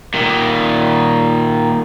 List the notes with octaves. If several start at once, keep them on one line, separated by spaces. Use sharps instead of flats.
A#2 D#3